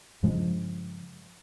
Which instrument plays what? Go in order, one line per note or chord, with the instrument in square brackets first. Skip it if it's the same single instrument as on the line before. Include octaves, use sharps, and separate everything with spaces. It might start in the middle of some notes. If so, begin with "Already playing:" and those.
[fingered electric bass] G2 C#3 F3 G#3